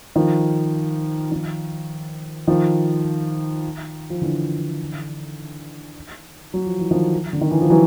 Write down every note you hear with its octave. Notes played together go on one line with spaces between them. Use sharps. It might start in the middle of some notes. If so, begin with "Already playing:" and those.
D#3 F3
D#3 F3
D#3 F3
F3
D3 E3
F#3
F3
E3
D#3 F3
D3
D#3
E3
F3
E3 F#3